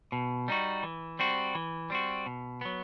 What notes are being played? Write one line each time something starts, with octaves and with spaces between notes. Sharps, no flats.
B2
G3 D#4 F#4
E3
G3 C4 F#4
E3
G3 C4 F#4
B2
F#3 B3